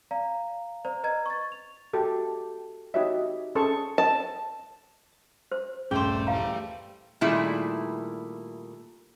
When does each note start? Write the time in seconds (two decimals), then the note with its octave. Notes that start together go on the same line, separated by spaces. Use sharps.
0.11 D5 F5 A#5
0.85 C5 D5 A#5
1.04 B4 D#5 A#5 G#6
1.26 C#6 A6
1.52 F7
1.93 F#4 G4 A4
2.94 D#4 F#4 G4 C#5 D#5 E5
3.55 C#4 G#4 A4 C5 C#6
3.98 A5
5.52 C5
5.91 D#1 G2 A3 C#4 G#4 C5 D5 G5
6.27 E3 G3 A3 F5 A#5
7.21 A#2 D#3 G3 A3 E4 G#4